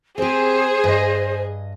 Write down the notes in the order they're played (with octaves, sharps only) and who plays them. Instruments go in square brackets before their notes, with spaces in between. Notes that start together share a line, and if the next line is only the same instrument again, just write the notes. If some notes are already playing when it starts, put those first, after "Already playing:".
[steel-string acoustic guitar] C4 G4 [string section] G#4 [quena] C5
[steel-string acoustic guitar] G2 D#5